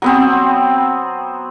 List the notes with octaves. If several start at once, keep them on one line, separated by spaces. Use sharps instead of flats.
F#3 B3 C4